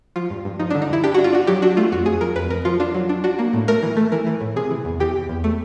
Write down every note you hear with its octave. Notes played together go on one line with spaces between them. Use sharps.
F3 F4
G2
G2
F3 D#4
D3 D4
D#4
G2 E4
D4 G4
D4 F#4
F4
D4 F#4
F#3 G4
D4 F#4
A3 F4
F2 F#4
F2 G#4
F3 A#4
F2 B4
F2 A#4
F3 F4
D4 F4
F#3
D4
D4 F#4
A#3
A2
A3 A#4
E3
A3
E3 A#4
E3
A2
C3 G#4
E3
E2
E3 G4
E2
E2
A3